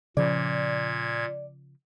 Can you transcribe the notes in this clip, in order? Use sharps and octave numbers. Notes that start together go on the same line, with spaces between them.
A#2 C#3 F3 D5 G#6